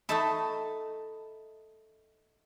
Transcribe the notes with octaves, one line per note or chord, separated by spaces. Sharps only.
A3 D#4 A4 D#5 A5 B5